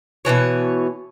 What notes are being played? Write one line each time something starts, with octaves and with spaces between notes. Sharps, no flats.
B2 D#3 E3 C#5